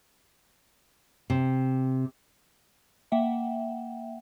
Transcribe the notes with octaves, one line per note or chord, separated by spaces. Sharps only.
C3
A#3 E5 F#5 G5